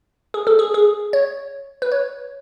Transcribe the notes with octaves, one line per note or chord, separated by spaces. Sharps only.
G#4
A4
G#4
G#4
C#5
B4
C#5